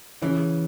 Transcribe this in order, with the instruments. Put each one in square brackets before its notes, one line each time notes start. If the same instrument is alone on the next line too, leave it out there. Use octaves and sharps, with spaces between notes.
[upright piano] C#3 [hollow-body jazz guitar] E3